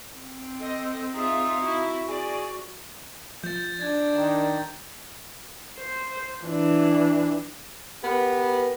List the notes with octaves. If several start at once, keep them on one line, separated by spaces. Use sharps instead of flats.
C4
A4 D#5
D#4 F4 G#4 E5 F5
E4 F#4 E5
G#4 D5
F3 G6 A6
D4 G#6 A6
D#3
C5
E3 D4
B3 G4 A#4 B4